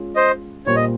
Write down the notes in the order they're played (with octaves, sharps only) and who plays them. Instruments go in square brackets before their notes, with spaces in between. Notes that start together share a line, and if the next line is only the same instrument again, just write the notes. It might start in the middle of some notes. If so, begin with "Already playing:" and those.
Already playing: [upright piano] G#3 C#4 F4
[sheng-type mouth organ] C5 D#5
[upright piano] A#2 G3 A#3 F4 C5 [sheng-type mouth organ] C#5
[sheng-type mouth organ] D#5